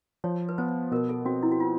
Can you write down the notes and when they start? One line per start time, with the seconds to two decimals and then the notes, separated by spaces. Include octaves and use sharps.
0.24 F3 C#5
0.49 B4
0.58 B3 C5
0.91 B2 A#4
1.09 A4
1.25 C4 F#4
1.43 E4
1.52 F#4
1.60 F4